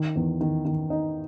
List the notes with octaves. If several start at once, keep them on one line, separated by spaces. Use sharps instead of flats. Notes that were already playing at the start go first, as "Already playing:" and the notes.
Already playing: D#3
E2
D#3
D#3
D#4